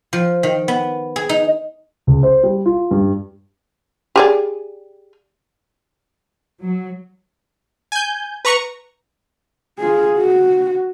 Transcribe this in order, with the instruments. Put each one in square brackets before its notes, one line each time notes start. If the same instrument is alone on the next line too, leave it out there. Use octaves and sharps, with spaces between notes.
[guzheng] F3
D#3
B3
G#4
D#4
[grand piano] C#2
C5
G3
F4
G2
[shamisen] G4 G#4 D5
[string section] F#3
[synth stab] G#5 G6
B4 A#5 C#6
[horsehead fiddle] F4 G#4
F#4